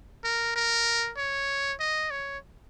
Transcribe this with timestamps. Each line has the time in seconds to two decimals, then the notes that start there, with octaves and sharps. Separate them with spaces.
0.24 A#4
0.56 A#4
1.17 C#5
1.79 D#5
2.11 C#5